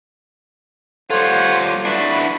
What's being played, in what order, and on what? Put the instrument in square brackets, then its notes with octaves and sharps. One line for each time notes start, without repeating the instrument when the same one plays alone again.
[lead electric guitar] G3 F4 [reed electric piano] A4 C6 [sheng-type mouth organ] C5 C#5 F#5
[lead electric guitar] D4 E4 [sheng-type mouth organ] F#4 B4 B5